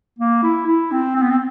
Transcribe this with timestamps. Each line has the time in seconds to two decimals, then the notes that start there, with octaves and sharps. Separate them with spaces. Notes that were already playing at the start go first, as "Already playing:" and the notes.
0.19 A#3
0.43 E4
0.67 E4
0.91 C4
1.15 C4
1.22 B3
1.30 C4